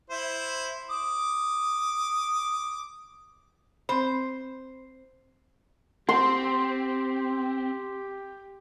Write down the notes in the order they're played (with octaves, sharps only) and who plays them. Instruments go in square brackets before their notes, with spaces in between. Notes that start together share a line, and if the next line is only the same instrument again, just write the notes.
[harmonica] E4 C5
D6 D#6
[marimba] C4 B5 [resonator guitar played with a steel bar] C5
[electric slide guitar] C4 [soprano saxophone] G4 [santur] C6